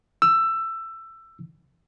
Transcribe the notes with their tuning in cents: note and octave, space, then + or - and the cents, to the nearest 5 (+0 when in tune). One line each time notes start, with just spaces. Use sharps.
E6 +15